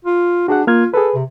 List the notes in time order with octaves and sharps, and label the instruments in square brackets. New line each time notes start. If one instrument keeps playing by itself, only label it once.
[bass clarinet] F4
[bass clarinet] D4 [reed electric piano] F#4 G#4 F#5
[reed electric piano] A#3 F6 G#6 [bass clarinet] F4
[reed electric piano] G#4 B4 [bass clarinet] A4
[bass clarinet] C3